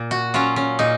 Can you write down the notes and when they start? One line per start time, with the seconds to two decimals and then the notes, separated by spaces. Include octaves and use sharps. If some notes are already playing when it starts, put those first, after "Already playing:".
Already playing: A#2
0.11 F#4
0.34 F#3 C#4 F4
0.56 C#4
0.79 A#2 D#4